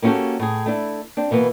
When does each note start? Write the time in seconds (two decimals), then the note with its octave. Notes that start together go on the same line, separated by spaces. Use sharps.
0.02 A#3 B3 C#4 F#4 G4 A4
0.39 A2 G#4
0.66 A3 D4 E4
1.17 C4 D4
1.31 B2 E3 A#3 B3